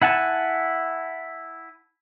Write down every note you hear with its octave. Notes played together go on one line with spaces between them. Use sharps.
E4 F#5 G#5 A5